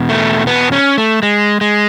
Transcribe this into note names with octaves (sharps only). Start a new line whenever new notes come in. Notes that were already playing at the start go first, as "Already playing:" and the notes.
Already playing: E2 B2
A3
B3
C#4
A3
G#3
G#3